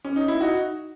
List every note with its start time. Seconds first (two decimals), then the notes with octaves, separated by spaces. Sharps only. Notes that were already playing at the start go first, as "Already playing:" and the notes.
0.05 C#4
0.16 D#4
0.28 E4
0.41 D#4 F#4